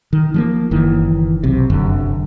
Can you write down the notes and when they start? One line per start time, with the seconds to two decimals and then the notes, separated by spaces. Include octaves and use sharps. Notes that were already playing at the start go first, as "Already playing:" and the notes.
0.13 D#3
0.34 F3 G3 A#3
0.71 F#1 D#3 E3
1.43 B1 C3
1.70 F1 F#2 D3